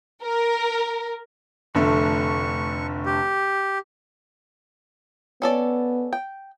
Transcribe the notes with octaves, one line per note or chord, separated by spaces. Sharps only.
A#4
F1 D3 A3 C#6
G4
B3 C#4 A4 D5
G5